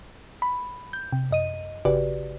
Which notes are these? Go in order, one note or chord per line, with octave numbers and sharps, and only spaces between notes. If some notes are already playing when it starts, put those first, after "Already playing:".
B5
G6
C3
F#2 D#5 D#7
G#1 C#3 F#4 G4 B4 D5